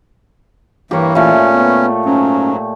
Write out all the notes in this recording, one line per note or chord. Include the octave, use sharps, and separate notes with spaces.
G2 E3 A#3 G4 C#5
A#2 A3 C#4
B3
G#2 F#3 C#4